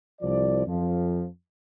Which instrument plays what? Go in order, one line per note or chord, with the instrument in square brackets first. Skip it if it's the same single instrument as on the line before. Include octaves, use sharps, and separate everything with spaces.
[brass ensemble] C2 F3 D5
F2 F3